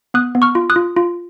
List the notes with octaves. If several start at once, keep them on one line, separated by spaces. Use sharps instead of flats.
B3 D#6 F#6
B3
C#6 F6
F4
D#6 F#6
F4
F4